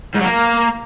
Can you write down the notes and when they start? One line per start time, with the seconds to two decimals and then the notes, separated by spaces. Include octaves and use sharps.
0.14 G#2
0.20 F#3
0.25 A#3